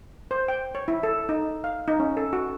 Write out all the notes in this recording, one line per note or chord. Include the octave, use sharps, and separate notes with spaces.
C5
G5
C#5
E4
A4
D#4
F5
D#4
C#4
A4
F#4